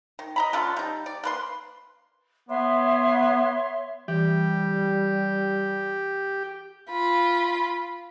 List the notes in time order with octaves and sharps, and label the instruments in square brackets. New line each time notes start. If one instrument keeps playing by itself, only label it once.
[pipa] D#3
D#5 A#5 B5
D3 C#4 F4 A4
G3 D#4
D5
A#3 B4 C6
[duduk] B3 [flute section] C#5 E5 C6
[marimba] E3 [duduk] G3 [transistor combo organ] G4
[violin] F4 B5